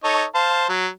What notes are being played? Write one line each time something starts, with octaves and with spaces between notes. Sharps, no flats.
D#4 A4 C#5
C5 F5 A5
F#3